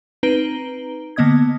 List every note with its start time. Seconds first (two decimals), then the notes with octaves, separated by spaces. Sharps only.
0.23 C4 D#4 B4 A#5 D7 G7
1.16 D3 A#3 B3 D#5 D#6 G#6